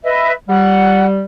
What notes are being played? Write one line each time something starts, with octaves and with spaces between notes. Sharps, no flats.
B4 D#5 E5
G3 F#5